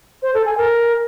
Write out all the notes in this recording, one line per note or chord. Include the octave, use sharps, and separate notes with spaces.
C5
A4
G#5
A#4